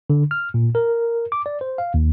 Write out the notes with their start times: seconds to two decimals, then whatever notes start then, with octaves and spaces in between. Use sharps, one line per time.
0.10 D3
0.31 F6
0.54 A#2
0.75 A#4
1.32 D6
1.46 D5
1.61 C5
1.78 F5
1.94 D#2